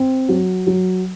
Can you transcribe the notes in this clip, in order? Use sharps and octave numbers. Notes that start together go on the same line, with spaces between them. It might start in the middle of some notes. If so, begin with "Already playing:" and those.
Already playing: C4
F#3
F#3